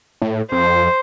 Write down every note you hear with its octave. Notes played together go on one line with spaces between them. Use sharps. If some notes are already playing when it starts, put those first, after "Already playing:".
A2
F2 C5